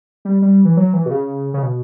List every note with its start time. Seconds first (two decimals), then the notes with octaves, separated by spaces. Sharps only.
0.25 G3
0.42 G3
0.65 E3
0.77 F#3
0.93 E3
1.06 B2
1.11 C#3
1.54 C#3
1.63 B2